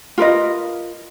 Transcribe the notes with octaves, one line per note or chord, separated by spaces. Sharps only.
F4 A#4 B4 D#5